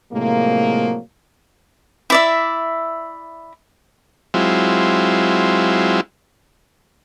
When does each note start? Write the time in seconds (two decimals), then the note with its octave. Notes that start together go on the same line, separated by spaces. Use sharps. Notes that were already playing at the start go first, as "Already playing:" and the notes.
0.13 A2 C3 F3 F#3 G#3 A#3
2.10 E4 D5 E5
4.34 F#3 G#3 C4 E4 F4